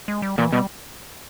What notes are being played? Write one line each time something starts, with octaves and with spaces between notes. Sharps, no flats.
G#3
G3
A#2 E3
B2 G3